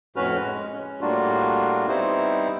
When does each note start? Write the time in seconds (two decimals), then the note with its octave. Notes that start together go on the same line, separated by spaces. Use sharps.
0.16 F2 A2 C#4 F#4 B4 F6
0.39 G#3
0.73 C#4
1.01 A2 G3 A#3 D4 F4 F#4
1.88 G3 B3 C4 D#4 E4 C5